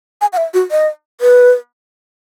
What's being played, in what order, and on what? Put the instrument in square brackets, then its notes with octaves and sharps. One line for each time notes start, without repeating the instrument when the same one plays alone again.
[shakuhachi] G#5
F#5
E5
F#4
D#5
B4